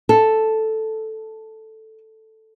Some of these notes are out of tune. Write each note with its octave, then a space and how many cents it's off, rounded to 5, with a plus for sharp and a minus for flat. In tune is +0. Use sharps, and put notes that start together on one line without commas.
A4 +0